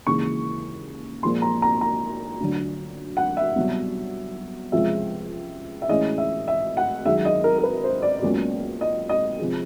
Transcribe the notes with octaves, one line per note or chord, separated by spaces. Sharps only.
D#2 C#3 E3 G#3 C#6
A#2 F3 G#3 C6
A#5
A#5
A#5
D2 D3 F#3
F#5
E5
C2 B2 F#3
C#2 C3 F3 G#3 E5
E5
A2 E3 G#3 C#4 D#5
E5
E5
F#5
F#2 D#3 G#3 E5
D#5
A#4
A#4
B4
C5
D5
C#2 B2 F#3 A#3 C#4
D#5
D#5
C3 F3 G#3